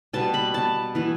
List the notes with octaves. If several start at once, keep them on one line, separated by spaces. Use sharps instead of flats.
B2 G3 B3 A5
B5
A5
E3 B3